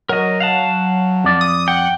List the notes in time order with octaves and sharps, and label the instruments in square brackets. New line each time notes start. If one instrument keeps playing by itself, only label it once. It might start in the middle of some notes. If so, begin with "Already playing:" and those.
[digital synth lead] F#3 [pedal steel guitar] A#4 D#5
[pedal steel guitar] F5 F#5 A5
[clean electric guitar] F2 D5
[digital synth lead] D#6
[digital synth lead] F#5 [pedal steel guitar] G5